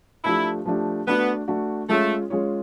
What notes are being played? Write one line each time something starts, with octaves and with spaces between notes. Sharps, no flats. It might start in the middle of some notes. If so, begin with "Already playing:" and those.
F3 A3 D4 E4 G4
F3 A3 D4 G4
A3 B3 D4 F#4
A3 D4 F#4
G#3 A3 C#4 F4 G#4 C#5
G#3 C#4 F4 G#4 C#5